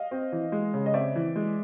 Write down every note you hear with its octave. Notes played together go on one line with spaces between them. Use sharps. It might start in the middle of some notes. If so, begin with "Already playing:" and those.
Already playing: D#5 F5
C4
E3
G#3
C#3
D#5
C4 D5 E5
E3
G#3